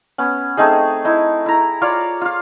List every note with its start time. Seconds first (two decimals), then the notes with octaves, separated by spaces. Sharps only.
0.18 B3 C#4
0.57 A3 C4 D#4 G#4
1.05 D#4 E4
1.46 E4 A#5
1.82 F4 C#5 D5 F5
2.21 F4 F5